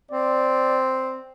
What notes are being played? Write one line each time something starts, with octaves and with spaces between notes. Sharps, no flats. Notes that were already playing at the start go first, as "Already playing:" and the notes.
C4 D5